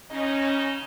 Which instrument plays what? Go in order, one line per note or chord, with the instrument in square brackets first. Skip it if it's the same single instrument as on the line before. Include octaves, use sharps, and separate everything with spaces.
[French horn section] C#3 D#4 D#5 [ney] C#4